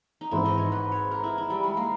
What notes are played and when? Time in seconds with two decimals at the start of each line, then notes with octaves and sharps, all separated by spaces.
0.21 D#4
0.31 G#1 G#2 E3 E4
0.45 D#5
0.58 C#5
0.72 B4
0.92 C#5
1.11 A#4
1.24 E4
1.38 E4
1.50 G3
1.63 G#3
1.77 A#3